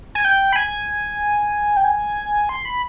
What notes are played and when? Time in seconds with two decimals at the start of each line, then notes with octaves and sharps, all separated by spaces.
0.15 G#5
0.25 G5
0.53 B5
0.56 G#5
1.77 G5
1.84 G#5
2.49 C6
2.65 B5